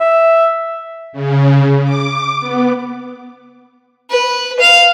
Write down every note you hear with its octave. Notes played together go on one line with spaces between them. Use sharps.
E5
C#3
D6
B3
B4
F5